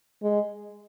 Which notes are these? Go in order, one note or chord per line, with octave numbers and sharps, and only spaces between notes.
G#3